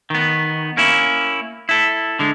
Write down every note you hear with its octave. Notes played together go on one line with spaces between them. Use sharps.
D#3 B3
A#3 C#4 E4
E4 A4
D3 G#3